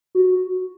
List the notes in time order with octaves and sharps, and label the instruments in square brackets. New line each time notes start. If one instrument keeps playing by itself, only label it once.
[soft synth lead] F#4